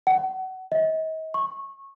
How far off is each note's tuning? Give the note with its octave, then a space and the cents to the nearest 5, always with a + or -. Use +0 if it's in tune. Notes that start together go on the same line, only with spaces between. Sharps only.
F#5 +30
D#5 +40
C#6 -20